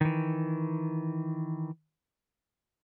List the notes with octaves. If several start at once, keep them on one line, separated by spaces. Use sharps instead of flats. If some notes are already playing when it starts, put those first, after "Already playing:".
D#3 E3